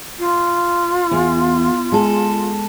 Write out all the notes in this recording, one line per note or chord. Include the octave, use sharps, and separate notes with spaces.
F4
E2
G#3 A4